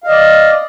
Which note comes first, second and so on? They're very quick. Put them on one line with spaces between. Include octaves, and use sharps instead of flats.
F5 D#5 D5